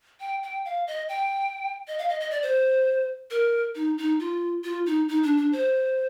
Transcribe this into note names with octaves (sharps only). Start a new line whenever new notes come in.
G5
G5
F5
D#5
G5
D#5
F5
D#5
D#5
D5
C5
A#4
D#4
D#4
F4
F4
D#4
D#4
D4
D4
C5